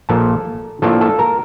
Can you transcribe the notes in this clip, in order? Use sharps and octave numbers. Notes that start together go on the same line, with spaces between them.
A#1 A#2 F3 A4 A5
A2 F3 A#3 D4 A4 A5
A4 A5
A#4 A#5